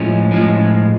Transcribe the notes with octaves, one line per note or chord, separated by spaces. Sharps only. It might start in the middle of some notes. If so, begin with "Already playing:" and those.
Already playing: A2 F3 G#3 C#4
A2 F3 G#3